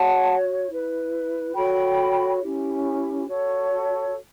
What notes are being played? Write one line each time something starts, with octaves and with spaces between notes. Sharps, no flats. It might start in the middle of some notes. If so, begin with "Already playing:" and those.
Already playing: F#4 C#5 F#5 A5
E4 B4
F#4 A4 C#5 G5 B5
C#4 E4 G4
F#4 A4 C#5